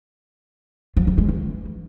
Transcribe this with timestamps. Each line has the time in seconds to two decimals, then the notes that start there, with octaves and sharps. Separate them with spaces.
0.97 F3
1.07 F3
1.18 G#3
1.29 E3